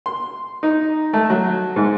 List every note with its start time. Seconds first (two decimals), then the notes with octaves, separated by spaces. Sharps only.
0.06 C6
0.63 D#4
1.13 A3
1.30 F#3
1.76 G#2